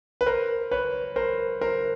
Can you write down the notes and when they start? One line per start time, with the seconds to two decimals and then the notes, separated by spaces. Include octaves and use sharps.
0.21 B4
0.26 A#4 C5
0.71 B4 C#5
1.16 A#4 C5
1.61 A#4 C5